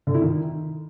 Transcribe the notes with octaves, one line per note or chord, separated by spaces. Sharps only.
D3
E4
D#3